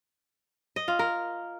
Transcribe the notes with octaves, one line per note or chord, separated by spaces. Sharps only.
D#5
F4
A#4